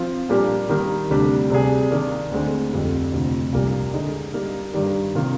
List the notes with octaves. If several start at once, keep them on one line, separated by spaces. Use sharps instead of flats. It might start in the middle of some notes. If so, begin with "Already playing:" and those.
Already playing: F3 C4 F4
A#2 G3 A#3 D4 G4
D#3 G3 A#3
D2 C3 G3 D4
C3 G3 D4 G#4
D#3 A#3 D4
D2 D3 G#3 C4
F2 D3 G3
D2 C3 F3
C2 A#2 G3 A#3
D3 G#3 D#4
G3 A#3 D#4
G2 D#3 G3
C3 D#3 A#3 F4